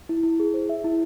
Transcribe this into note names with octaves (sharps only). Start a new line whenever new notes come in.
E4
E4
G#4
C5
E5
E4